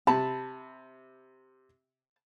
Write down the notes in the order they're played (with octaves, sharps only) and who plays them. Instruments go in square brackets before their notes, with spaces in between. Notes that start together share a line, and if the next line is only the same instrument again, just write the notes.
[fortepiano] C3 B5 [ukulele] A5